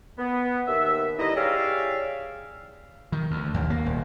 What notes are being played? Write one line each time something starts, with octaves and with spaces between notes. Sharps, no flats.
B3
D#2 E5
G2 D3 D#4 E4 D#5
G4 G#4 C#5 D5 E5 F5
D#3
D2
D#2
A#3
D#1